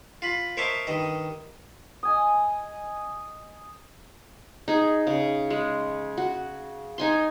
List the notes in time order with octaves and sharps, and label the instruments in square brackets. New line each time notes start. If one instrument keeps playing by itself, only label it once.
[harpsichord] F4 B5
A#4 C5 C#5 D#5 E5 A5
G2 D#3 D#5
[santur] D#5 G#5 D#6
[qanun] D#4 G#4
C#3
G#3
F#4
D#4 G#5 C6